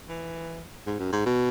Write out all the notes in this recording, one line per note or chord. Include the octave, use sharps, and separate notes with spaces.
E3
G#2
F#2
G#2
B2